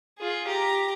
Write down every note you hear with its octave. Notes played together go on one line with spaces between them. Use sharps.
F4 G#4
G4 A#5